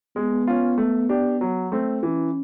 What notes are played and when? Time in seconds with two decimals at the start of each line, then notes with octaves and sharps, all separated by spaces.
0.16 G#3 B3
0.47 C#4 F4
0.78 A3
1.09 D4 G4
1.41 F#3
1.72 A3 C4
2.03 E3 C#4